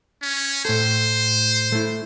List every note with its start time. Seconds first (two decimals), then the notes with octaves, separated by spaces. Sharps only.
0.22 C#4
0.65 A2 A4 C5
1.72 A3 E4